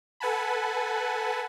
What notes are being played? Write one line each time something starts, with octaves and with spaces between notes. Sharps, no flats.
A4 B4 F#5 G#5 A5 B5